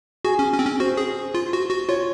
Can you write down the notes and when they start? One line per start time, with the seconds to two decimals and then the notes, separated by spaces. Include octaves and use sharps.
0.25 F#4 G#4
0.39 C#4
0.53 C#4
0.59 C4
0.67 C#4
0.80 F#4 C5
0.97 G#4
1.34 F4
1.53 F#4
1.71 F#4
1.89 F4 C#5